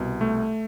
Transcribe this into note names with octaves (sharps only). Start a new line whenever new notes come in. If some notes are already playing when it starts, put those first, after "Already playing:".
Already playing: C2 B2
A3